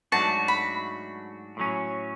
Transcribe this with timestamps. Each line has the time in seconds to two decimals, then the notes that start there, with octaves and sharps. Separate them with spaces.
0.12 G#2 F#3 A3 D4 F#4 A5
0.48 B5
1.57 A2 F#3 C#4